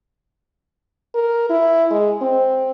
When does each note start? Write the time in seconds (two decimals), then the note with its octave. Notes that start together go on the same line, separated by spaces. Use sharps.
1.15 A#4
1.50 E4
1.91 G#3
2.22 C4